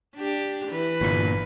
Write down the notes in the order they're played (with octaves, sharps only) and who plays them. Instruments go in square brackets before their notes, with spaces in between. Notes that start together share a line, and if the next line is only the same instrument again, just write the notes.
[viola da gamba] D4 G4
E3 B4
[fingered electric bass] G1 A#2